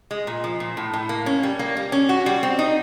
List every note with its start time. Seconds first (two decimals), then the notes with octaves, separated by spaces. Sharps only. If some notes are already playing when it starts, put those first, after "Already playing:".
0.11 G#3
0.27 A#2
0.44 F3
0.60 A#2
0.77 A2
0.93 A2
1.09 A#3
1.26 C#4
1.43 G3
1.59 A#3
1.77 G3
1.92 C#4
2.09 F#4
2.26 G3
2.43 C4
2.59 D#4